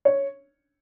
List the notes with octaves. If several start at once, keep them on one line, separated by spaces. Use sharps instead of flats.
C#5